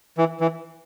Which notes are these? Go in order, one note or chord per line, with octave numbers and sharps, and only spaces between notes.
E3
E3